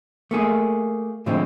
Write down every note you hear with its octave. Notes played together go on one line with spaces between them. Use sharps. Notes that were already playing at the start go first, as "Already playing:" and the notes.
A3 A#3 G#4
A2 D3 F3 G#3 C4 C#4